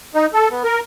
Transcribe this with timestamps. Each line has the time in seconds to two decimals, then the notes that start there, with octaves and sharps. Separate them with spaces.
0.15 D#4
0.34 A4
0.51 B3
0.64 A#4